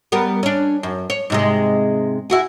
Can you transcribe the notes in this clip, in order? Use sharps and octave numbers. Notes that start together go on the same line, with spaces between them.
G3 B3 A#4
C#4 D4
F#2
C#5
G#2 C3 G#3
E4 F#4 G#4